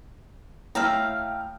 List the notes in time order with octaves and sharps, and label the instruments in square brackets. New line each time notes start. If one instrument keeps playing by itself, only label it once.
[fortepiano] A2 [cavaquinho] E5 F5 A#5 [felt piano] G5 F6